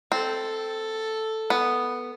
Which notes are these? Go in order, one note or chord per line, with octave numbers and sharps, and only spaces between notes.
C4 A4
B3